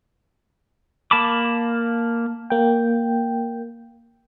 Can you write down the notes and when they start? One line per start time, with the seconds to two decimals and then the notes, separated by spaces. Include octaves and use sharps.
1.11 A#3 A5 B5 D6
2.50 A#3 G5